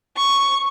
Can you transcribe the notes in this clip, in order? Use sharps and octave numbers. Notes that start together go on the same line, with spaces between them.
C#6